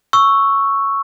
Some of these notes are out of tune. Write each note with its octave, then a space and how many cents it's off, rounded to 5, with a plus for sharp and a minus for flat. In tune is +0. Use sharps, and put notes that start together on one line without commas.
C#6 +0 E6 +0